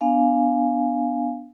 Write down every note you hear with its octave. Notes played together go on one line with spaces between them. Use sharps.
B3 D4 F5 G#5